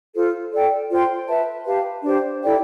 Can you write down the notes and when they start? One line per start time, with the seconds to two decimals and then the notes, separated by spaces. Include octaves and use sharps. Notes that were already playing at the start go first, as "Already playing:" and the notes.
0.14 F4 A4 C5
0.52 A4 D5 G5
0.89 F4 C5 G5 C6
1.27 B4 E5 A5
1.66 G4 B4 F5 A5
2.04 D4 G4 C5
2.43 E4 A4 D5 G5